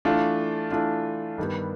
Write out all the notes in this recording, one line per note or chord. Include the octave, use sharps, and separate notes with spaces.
E3 A3 D4 F4
E3 A3 D4 F4
G2 D#3 G3 B3